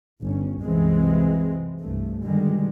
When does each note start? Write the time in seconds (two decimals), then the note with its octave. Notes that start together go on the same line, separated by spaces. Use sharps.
0.23 G1 C#4
0.63 C2 F#2 C3 E3 G#3 C4
1.80 C2 G2 A3
2.23 G2 B2 D3 D#3 G3 G#3